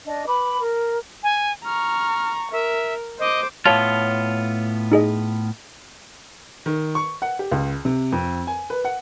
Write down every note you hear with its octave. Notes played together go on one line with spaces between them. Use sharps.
D4 D#5
B4 B5 D6
A#4
G#5
A#5 C#6 F6
A#4 E5
C5 D#5 D6
A2 B3 F4 C#5 F5 A5
D#4 G#4 D#5
D#3
C#6
F#5
G4
C#2
C3
F2
G#5
B4
F#5